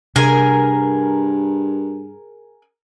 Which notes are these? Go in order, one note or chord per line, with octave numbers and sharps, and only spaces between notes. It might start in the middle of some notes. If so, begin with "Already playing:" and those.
G2 C3 D4 G#4 A#4 G#5